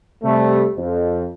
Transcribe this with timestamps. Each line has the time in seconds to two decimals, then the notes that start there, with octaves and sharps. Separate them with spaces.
0.23 C3 G3 A3
0.76 F2